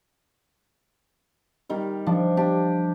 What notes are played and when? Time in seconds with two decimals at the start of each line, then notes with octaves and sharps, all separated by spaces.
1.69 D#3 G3
2.06 F3 D4
2.37 D4 G4